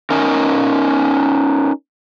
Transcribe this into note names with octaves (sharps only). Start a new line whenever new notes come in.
C#4 D#4 A#4